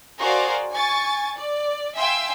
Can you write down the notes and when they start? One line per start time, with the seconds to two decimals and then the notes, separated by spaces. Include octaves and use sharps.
0.20 F#4 G#4 A#4 C5 D5 F5
0.72 G#5 C#6 A6
1.35 D5
1.96 E5 F5 G5 G#5 C6 E6